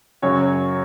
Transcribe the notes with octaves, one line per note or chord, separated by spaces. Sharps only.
F#2 C#3 F#3 C#5